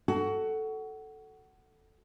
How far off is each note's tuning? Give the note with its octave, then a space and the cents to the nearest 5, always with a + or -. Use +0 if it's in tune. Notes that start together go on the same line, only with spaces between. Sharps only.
F#4 +20 A4 +0